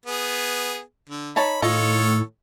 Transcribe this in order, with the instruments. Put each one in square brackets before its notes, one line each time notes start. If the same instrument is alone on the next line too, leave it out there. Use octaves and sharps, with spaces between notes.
[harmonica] B3 G#4
D3
[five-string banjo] D#4 C#5 A5 [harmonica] B5
[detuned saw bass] A2 [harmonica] D#3 A4 C#5 [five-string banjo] F4 D#5